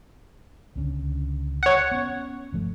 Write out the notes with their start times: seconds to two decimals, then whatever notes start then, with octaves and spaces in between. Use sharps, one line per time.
0.76 C#2 D3 C#4
1.63 C#5 F#5
1.91 B3 C#4
2.52 G1 F3 A3